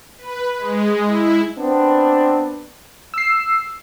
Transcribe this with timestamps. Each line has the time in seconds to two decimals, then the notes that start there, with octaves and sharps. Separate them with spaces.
0.18 B4
0.59 G#3
1.06 E4
1.58 B3 C4 D4
3.14 E6 C7